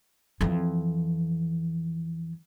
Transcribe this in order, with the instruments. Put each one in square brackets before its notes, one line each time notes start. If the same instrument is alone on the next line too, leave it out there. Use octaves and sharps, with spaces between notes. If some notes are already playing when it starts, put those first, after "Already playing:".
[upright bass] F2 E3